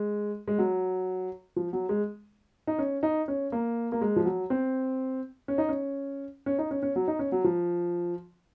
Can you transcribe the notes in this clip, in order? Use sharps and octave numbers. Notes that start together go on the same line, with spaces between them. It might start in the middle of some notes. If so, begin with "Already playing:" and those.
Already playing: G#3
G#3
F#3
F3
F#3
G#3
D#4
C#4
D#4
C#4
A#3
A#3
G#3
F3
F#3
C4
C#4
D#4
C#4
C#4
D#4
C#4
C#4
F#3
D#4
C#4
F#3
F3